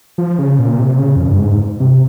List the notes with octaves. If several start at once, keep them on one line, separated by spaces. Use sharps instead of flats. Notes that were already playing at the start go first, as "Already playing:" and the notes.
F3
C#3
A#2
C3
C#3
F2
G2
G#2
C3